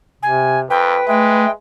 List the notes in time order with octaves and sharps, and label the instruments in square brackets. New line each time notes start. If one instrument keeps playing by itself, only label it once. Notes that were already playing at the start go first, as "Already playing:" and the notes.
[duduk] C3 [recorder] G#5
[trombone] F2 [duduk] B4 [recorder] G5
[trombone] G#3 [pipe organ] A3 [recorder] G5